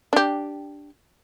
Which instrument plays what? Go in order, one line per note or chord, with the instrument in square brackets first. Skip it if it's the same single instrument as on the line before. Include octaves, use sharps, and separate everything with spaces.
[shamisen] D4 G4